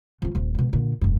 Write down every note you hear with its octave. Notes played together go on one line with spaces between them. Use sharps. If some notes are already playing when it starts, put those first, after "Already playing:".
F3 F4
D#1 F3
G#2 B2
A#2 D3
E1 F#2